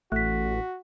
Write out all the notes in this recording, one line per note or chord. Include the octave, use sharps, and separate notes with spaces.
A1 A3 F#4 F#6 B6